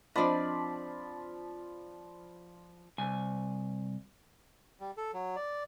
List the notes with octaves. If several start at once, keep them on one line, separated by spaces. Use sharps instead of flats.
F3 C4 D4 D5 D#5 B5
C2 G#5
G3
A4
F#3
D5